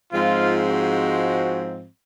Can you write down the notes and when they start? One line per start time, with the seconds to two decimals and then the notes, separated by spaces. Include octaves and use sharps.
0.12 G#2 F3 G#3 C4 F4
0.66 F#4